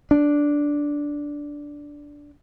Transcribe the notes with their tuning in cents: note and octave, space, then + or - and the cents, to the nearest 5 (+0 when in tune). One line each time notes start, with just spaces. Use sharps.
D4 -5